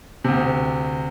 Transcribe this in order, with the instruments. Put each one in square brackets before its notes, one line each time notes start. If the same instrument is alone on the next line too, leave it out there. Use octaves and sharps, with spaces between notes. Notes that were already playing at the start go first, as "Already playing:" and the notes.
[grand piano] D2 C3